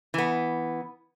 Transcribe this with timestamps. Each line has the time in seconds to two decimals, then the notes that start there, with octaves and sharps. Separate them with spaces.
0.14 E3 B3